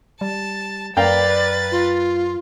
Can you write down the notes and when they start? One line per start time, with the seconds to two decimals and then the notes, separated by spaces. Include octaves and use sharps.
0.21 G3 A5
0.97 F#2 A#4 B4 D5 F5 G5 A6
1.72 F4